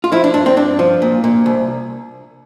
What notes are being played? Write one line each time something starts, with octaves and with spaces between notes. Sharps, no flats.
F4
F3 E4
D4
G2 D4
C4
G2 D4
F3
A#2
A#2
C2